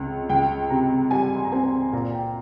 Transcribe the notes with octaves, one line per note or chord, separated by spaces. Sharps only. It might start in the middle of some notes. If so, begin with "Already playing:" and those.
Already playing: C#2 C3
C#2 G5
C3 A#5
G3 G#5
C6
A#5
C4 G#5
A#2 A#5
G5